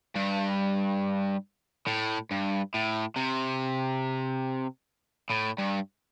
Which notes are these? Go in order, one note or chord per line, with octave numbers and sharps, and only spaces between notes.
G2
A2
G2
A2
C3
A2
G2